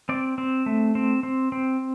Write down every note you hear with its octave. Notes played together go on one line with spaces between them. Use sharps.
C4 D5
C4
A3
C4
C4
C4